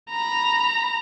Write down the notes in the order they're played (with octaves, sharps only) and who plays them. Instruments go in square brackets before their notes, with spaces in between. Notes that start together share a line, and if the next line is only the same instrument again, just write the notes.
[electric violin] A#5 B5